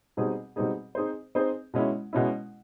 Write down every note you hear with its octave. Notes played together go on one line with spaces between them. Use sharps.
B2 G3 C4 D#4 G#4
B2 G3 C4 D#4 G#4
C4 D#4 G#4 C5
C4 D#4 G#4 C5
B2 G#3 C#4 E4
B2 G#3 C#4 E4